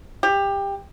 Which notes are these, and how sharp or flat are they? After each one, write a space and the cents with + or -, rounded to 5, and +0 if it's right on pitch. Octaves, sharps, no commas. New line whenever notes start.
G4 +20